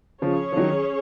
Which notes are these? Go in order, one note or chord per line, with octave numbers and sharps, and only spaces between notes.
C#3 F3 C#4 G#4 C#5
F3
D#3 F#3